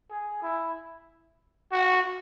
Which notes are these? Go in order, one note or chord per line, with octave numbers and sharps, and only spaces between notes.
G#4
E4
F#4